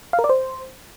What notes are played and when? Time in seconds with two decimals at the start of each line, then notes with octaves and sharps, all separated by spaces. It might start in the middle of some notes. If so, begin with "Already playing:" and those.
0.13 F5
0.19 A#4
0.24 D5
0.29 C5